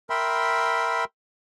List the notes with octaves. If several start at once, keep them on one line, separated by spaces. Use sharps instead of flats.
A#4 E5 G5 B5 C6